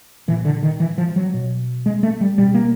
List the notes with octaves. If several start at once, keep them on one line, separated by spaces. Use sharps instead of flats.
A#2 E3
D3
D#3
E3
F3
F#3
B2
G#3
A3
G3
B2 G3
A#3